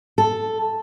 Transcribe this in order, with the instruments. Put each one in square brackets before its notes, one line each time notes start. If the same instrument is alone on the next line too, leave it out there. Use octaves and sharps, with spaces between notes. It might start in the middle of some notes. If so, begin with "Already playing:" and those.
[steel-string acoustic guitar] A4